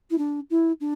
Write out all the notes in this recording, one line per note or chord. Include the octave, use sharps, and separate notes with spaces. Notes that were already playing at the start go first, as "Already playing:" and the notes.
E4
D4
E4
D4